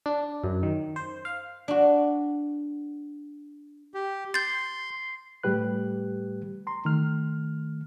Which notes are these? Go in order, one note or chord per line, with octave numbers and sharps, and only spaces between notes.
D4
F#2
D#3
C5
F5
D4 F#4
G4
C6 G6 A6 C7
A2 G3 A3 G4 B4 F#6
A#5 C6
D#3 A3 F6